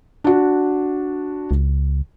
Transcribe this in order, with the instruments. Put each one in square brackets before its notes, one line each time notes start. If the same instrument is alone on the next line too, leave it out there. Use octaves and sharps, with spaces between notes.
[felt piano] D4 F#4
[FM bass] C#2